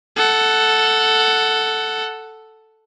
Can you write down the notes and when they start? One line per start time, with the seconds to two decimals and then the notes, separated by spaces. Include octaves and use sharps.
0.17 A4 F#5